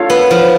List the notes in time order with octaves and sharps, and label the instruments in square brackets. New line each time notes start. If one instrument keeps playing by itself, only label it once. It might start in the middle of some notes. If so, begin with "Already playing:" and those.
Already playing: [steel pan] D4 F4 A4 C#5 F5
[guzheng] B3
F3